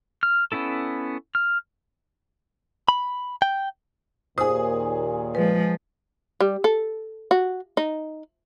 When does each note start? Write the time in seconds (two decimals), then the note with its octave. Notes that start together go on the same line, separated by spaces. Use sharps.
0.23 F6
0.52 B3 C#4 E4 A4
1.35 F6
2.89 B5
3.42 G5
4.38 D#2 A#2 G#4 C5 D#6
5.35 F3 G#3 B4
6.40 G3
6.64 A4
7.31 F#4
7.77 D#4